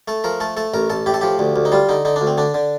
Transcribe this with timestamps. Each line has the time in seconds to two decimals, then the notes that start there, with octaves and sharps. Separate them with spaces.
0.08 A3 A4
0.24 F3 A#4
0.40 A3 A4
0.57 A3 A4
0.74 A1 A#4
0.90 A1 A4
1.06 A2 G4
1.14 A4
1.21 F3 G4
1.39 D2
1.56 D2
1.65 D#4
1.72 G3 F4
1.89 D3 D#4
2.05 D3 D#4
2.16 D4
2.21 D2
2.27 C4
2.38 D3 D4
2.54 D3